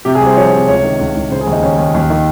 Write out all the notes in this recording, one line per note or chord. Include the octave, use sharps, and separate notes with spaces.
C3 G4
G#4
C2
C5
F3 C#5
C3
C#2 C#5
D#3
C#2
C#2
C#3 C5
G#4
D#2
D#4
D#2 C#4
D#2
D#2
D#3